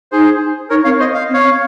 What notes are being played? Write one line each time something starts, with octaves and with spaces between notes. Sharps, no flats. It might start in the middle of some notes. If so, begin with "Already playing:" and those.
D#4 G#4 C5
D#4 A#4 C#5
C4 C#5 F5
C5 D#5
F5
C4
C#5 F5
C4